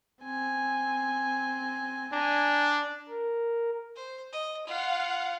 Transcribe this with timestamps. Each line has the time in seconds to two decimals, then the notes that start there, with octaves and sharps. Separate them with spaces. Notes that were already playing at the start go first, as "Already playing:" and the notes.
0.23 C4 G#5
2.13 D4 G#5 A#5
3.09 A#4
3.96 C5
4.32 D#5
4.67 F4 F5 F#5